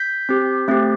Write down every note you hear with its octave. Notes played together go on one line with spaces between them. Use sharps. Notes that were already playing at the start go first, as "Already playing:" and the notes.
Already playing: G6 B6
C4 G4
A3 C4 G4